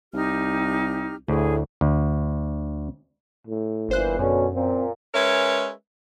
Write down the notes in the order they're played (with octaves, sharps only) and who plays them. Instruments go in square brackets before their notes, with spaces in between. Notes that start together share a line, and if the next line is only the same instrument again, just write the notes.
[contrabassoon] C2 [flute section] D#4 G4 F6
[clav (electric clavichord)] D2 [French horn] A2 [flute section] G#4
[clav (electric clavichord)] D2
[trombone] A2
[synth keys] G1 C5 F#6 [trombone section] A#2 E3
[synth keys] F#2 [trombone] B2 [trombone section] D3 C#4
[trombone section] A#2 [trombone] C4
[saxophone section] G#3 C#4 A#4 B4 C#5 E5